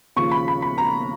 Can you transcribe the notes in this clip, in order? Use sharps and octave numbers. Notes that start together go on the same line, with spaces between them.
D#2 C#3 F3 C#6
B5
B5
B5
A#5